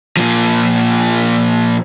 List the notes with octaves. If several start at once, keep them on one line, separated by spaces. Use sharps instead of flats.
A#2 F3